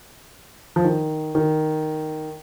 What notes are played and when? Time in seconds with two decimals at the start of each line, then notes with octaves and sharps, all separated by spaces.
0.76 F3
0.84 D#3
1.35 D#3